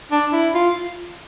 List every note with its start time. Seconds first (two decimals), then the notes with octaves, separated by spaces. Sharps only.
0.12 D4
0.33 E4
0.54 F4